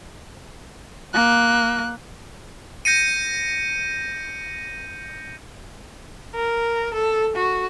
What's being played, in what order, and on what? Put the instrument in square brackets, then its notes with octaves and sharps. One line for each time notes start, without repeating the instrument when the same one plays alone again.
[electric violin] A#3 F#6
[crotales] G6 A#6 C#7 D#7
[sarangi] A#4
A4
F#4